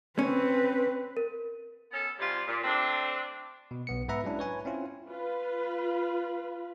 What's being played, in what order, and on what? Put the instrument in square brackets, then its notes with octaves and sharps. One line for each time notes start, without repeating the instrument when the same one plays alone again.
[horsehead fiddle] C4 B4 [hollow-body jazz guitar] C#4
[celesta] A#4
[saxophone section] B3 C#4 A4
G#2 C3 G3 F4
A#2
A3 C4 D4
[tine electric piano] B2
B1 B3 C#7
G#2 B3 B4 E5 A#5
F#3 G#3 C#4 D4 E4
B4 C#5 G#5
C4 C#4 E4 F4
[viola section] F4 B4